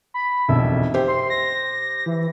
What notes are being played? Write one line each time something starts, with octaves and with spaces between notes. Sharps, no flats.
B5
E1 B1 F2 E5
G4 C5
C6
A#6
E3